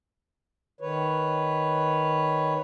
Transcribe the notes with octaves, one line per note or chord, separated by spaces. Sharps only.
D#3 B4 C#5